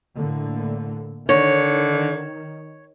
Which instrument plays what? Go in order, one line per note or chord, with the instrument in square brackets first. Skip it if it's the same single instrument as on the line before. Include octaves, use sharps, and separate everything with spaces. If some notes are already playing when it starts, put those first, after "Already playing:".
[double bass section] A2 D3 A#3
[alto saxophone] D3 [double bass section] D#3 [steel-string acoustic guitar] C#5